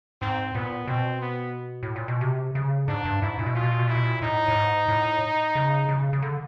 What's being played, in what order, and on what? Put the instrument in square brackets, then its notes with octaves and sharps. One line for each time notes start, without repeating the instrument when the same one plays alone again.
[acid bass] G#2 [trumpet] C4
[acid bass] A#2 [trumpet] B3
[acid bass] B2 [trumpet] C4
[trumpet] B3
[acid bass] A2
A#2
B2
C3
C#3
[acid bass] G#2 [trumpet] D4
[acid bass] G2
[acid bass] G#2 [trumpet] E4
[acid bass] A#2
B2
[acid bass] A#2 [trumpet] F4
[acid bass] B2
A#2
B2
[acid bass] A#2 [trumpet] E4
[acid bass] B2
A#2
[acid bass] A2 [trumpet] D#4
[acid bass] A2
G#2
A2
C#3
C#3
C#3
D3